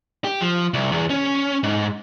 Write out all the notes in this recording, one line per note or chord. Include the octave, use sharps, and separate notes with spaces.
G4
F3
C2
E2
C#4
G#2